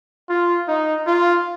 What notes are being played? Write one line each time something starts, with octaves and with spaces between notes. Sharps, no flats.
F4
D#4
F4